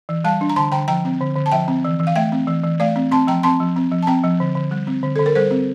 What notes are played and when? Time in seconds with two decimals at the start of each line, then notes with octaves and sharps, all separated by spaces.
0.09 E3
0.24 G3 F5 A5
0.41 D4
0.50 A#5
0.56 D3 A5 C6
0.72 D3 G5 A#5
0.88 F3 G5 A#5
1.05 C4
1.21 D3
1.36 D3
1.46 A5
1.52 F3 E5 G5
1.68 C4
1.85 E3
2.00 E3
2.07 F5
2.16 A3 E5 G5
2.32 C4
2.48 E3
2.64 E3
2.80 A3 D5 F5
2.96 C4
3.12 C4 A5 C6
3.27 F3 G5 A#5
3.43 C4 A5 C6
3.60 F3
3.76 C4
3.91 F3
4.03 A5
4.07 C4 G5 A#5
4.24 F3
4.40 D3
4.55 D3
4.71 G3
4.87 C4
5.03 D3
5.16 D3 A4
5.26 A#4
5.35 G3 A4 C5
5.51 C4